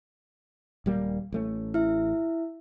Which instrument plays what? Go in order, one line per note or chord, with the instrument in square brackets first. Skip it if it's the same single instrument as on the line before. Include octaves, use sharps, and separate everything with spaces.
[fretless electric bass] D#1 G3 A#3
A1 A3 C#4
[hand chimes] E4 E5